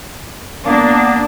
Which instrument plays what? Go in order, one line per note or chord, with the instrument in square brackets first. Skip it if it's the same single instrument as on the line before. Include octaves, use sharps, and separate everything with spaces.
[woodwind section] A#3 B3 [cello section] D4